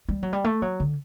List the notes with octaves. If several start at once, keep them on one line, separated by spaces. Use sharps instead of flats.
G3
F#3
G3
A3
F#3
D3